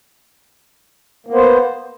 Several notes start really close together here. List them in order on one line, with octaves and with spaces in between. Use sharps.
A#3 B3 C5